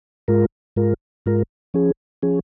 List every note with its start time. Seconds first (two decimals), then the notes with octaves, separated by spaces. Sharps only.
0.28 G#2 G#3 F4 A#4
0.76 G#2 G#3 F4 A#4
1.26 G#2 G#3 F4 A#4
1.74 F3 C#4 G#4
2.23 F3 C#4 G#4